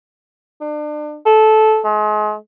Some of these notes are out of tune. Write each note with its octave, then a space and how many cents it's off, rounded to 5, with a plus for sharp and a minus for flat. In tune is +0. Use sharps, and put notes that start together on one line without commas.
D4 +35
A4 -15
G#3 +35